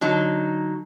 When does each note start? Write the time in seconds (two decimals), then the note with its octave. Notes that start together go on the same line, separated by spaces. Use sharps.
0.01 D3 F#3 D#4